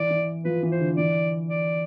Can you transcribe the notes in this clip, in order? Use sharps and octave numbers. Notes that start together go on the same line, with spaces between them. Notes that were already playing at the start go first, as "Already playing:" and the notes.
Already playing: E3 D5
E3
F3 B4
E3
C5
D3
E3 D5
D5